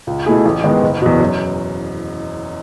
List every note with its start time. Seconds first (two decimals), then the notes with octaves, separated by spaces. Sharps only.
0.07 C#2
0.26 B2 A3 E4 G#4
0.45 A1
0.64 G#2 D#3 G#3 B3
0.82 F#1
1.02 E2 B2
1.20 F#2